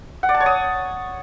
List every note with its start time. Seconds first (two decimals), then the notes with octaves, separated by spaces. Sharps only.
0.23 F#5
0.29 D5
0.34 A5
0.40 C#5
0.46 D#6